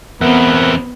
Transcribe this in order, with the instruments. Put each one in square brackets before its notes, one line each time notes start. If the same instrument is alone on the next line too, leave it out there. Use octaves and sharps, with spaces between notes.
[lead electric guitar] E2 C4 [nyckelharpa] B3 [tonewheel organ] A#4 E5 F#5